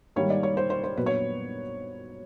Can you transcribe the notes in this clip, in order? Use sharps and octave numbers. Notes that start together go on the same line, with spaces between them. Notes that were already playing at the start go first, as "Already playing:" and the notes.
G#2 D#3 G3 A#3 C#5
D5
C#5
C5
C5
C5
A#2 F#3 B3 B4
C#5